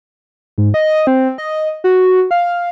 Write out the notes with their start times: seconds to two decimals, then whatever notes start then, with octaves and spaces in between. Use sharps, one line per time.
0.58 G#2
0.74 D#5
1.07 C4
1.38 D#5
1.84 F#4
2.31 F5